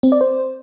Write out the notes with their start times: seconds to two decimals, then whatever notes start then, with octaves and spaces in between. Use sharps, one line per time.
0.03 C4
0.12 D5
0.21 C5